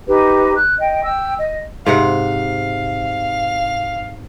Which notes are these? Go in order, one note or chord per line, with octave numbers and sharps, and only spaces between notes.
D#4 G4 B4
F#6
D#5 G5
G5 E6
D#5
G#2 C3 F5 F#5